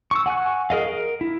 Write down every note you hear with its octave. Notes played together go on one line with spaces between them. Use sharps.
C#6 E6
F#5 G#5 C#6 F#6
G#4 A#4 D#5 F5
A#4
E4